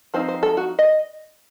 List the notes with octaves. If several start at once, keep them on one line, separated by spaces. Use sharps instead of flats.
F3 C4 D#4 C5
C5
A4
F#4
D#5